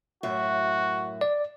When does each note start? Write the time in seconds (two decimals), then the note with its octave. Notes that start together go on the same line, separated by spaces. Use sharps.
0.23 F#2 A2 F#4 E5
1.21 D5